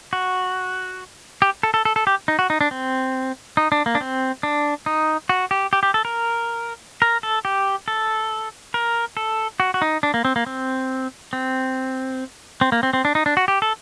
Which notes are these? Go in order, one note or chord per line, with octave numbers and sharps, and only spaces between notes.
F#4
G4
A4
A4
A4
A4
G4
D#4
F#4
D#4
D4
C4
D#4
D4
A#3
D4
C4
D4
D#4
F#4
G4
G4
G4
A4
A#4
A#4
A4
G4
A4
A#4
A4
F#4
F#4
D#4
D4
A#3
C4
A#3
C4
C4
C4
A#3
C4
C4
D4
D#4
D4
F#4
G4
A4